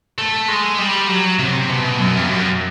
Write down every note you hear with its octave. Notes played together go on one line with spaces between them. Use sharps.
A3
G#3
G3
F#3
C3
B2
F#2
G2
F#2